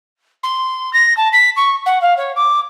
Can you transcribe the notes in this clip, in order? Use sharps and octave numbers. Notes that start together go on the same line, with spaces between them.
C6
A#6
A5
B6
C#6
F#5
F5
C#5
D6